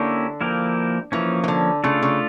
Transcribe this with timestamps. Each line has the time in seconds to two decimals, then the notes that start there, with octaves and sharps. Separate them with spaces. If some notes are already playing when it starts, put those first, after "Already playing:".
Already playing: D3 A#3 C#4 E4 G4
0.41 F3 A#3 E4 G4 A#4
1.12 E3 F3 A#3 C#4
1.44 E3
1.48 D3
1.84 C#3 A3 D4 F4 A4
2.03 C#3